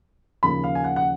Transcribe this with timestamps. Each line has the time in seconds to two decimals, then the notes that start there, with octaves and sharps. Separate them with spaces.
0.43 D#2 C#3 F3 B5
0.64 F5
0.75 G#5
0.84 F#5
0.96 F#5